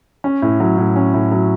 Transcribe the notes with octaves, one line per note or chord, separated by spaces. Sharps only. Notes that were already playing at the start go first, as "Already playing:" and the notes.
C#4
A2
F#3
A2
C#4
A2
F#3